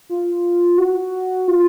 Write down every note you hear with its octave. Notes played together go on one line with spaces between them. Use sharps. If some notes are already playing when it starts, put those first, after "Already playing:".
F4
F#4
F4